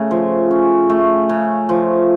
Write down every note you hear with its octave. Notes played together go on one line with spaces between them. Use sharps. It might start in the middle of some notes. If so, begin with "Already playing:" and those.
Already playing: C#3 A3
F3
C#4
A3
C#3
F3